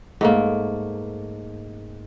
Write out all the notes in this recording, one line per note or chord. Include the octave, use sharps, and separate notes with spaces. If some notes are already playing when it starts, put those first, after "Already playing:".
G#2 A3 A#3